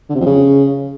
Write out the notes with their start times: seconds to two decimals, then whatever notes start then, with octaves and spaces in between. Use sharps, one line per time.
0.09 D3
0.15 C3
0.20 F2
0.26 C#3